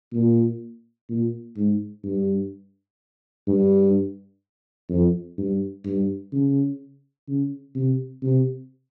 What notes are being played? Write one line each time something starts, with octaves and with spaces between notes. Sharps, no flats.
A#2
A#2
G#2
G2
G2
F2
G2
G2
C#3
C#3
C3
C3